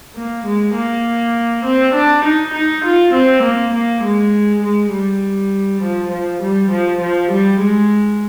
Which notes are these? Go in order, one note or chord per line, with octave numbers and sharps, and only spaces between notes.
A#3
G#3
A#3
C4
D4
D#4
D#4
F4
C4
A#3
A#3
G#3
G#3
G3
F3
F3
G3
F3
F3
G3
G#3